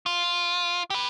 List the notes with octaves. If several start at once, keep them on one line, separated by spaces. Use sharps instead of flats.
F4
G4 B4